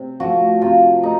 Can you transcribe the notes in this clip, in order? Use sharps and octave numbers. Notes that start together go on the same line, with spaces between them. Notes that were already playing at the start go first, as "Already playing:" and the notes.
Already playing: C3
F3 A3 F#4
C3 F4
A3 D#4